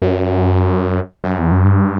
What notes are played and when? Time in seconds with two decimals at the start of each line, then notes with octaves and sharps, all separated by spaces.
0.02 F#2
1.24 F#2
1.38 E2
1.52 F#2
1.65 G2